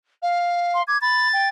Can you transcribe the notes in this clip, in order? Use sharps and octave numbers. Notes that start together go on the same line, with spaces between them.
F5
C6
D6 G#6
B5 A6
G5